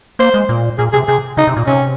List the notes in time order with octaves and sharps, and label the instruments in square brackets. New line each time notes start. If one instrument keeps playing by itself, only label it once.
[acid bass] A#3 [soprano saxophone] C5
[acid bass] G#3
A#2
[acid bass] A#2 [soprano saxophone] G#4
[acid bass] C3 [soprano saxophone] G#4
[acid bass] C3 [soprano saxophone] G#4
[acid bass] C#3 [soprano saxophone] D#4
[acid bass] C3
A#2
[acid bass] C3 [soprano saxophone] C#4